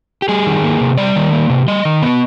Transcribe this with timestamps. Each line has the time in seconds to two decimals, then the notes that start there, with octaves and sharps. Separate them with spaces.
0.22 G4
0.28 G3 G#4
0.47 D#3
0.63 A#3
0.81 C3
0.98 G3 D5
1.16 D#3
1.33 A#3
1.50 C3
1.68 G3 D#5
1.85 D#3
2.02 B3